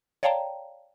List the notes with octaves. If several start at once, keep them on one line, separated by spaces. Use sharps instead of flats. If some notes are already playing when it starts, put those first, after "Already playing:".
C#5 D5 F5 G5 A5 A#5